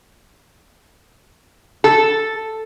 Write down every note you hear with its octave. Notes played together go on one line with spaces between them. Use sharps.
A4